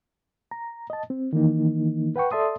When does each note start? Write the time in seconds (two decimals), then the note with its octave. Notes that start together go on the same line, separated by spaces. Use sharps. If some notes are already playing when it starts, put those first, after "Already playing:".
0.51 A#5
0.90 D#5 A5
1.10 C4
1.33 D#3 E3 A#3 D#4
2.16 B4 F#5 G5 C#6
2.32 A4 D5 E5 A5 C6 D#6